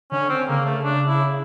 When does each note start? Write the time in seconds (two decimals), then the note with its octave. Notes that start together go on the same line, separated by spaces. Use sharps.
0.11 D3 C#4
0.29 C4
0.48 C#3 A#3
0.65 A3
0.83 D4
1.08 E4